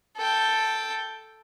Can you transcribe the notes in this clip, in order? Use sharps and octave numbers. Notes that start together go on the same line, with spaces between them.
A4 G5